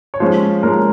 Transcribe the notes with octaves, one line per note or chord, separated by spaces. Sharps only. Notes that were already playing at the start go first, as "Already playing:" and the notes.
C#5
F3 G#3 C#4 C5
F3 G#3 C#4 A#4